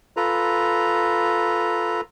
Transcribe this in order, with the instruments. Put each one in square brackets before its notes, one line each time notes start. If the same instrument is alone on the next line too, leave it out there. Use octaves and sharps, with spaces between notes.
[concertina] F4 A4 B4 A#5